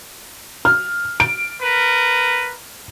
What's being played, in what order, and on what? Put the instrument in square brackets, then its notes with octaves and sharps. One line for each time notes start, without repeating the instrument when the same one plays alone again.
[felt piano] F6
D7
[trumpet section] A#4 B4